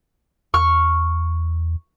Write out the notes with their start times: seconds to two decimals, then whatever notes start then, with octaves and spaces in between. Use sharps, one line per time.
0.54 E2 C#6 F6